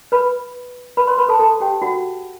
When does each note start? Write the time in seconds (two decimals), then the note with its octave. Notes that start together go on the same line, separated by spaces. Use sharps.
0.12 B4 B5
0.97 B4 B5
1.07 C5 C6
1.18 B4 B5
1.29 A4 A5
1.40 A4 A5
1.60 G4 G5
1.82 F#4 F#5